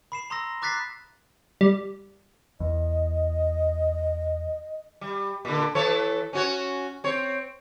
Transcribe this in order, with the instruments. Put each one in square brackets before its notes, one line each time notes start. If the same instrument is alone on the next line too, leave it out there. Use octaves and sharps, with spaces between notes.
[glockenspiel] B5 C7 E7
A#5 C6 D#6 E6 A#6
A#5 D6 F#6 A6 B6 C7
[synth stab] G3
[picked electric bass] E2 [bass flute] D#5
[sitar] G3
A#2 D3
E3 A4 C#5
C#4 F#4 C#5
C4 C#5